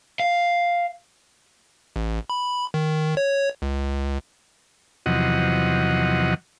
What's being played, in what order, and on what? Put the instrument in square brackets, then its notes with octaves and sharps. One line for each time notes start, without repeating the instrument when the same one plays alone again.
[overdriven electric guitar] F5
[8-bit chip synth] A1
B5
D#3
C#5
C#2
[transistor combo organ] E2 C3 F3 F#3 D#5 F#5